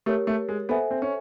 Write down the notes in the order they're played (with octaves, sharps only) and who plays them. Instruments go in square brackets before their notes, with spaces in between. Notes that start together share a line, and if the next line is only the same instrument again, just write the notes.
[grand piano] A3 [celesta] G4 A#4 C#5
[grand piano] A3
G#3
[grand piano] B3 [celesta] A4 C5 E5 G#5
[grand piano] C4
C#4